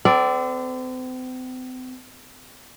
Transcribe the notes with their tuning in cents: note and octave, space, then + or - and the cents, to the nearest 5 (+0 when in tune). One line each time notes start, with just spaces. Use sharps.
C4 -40 A4 +0 D5 +0